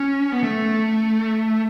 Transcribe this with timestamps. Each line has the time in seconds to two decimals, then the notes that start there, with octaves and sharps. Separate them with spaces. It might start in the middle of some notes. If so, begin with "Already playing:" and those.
Already playing: C#4
0.32 B3
0.43 A3